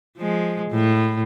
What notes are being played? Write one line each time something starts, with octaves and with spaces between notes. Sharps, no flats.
F3 G#3
A2